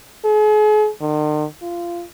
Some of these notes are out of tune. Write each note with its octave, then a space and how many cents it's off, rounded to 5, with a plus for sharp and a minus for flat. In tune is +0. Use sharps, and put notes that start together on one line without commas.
G#4 +40
D#3 -45
F4 -20